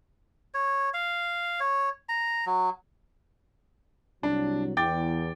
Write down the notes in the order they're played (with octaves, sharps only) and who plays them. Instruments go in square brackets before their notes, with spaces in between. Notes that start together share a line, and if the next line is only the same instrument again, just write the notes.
[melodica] C#5
F5
C#5
A#5
F#3
[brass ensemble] C2 F#3 [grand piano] D4
[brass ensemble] E2 [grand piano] G5 D6 A6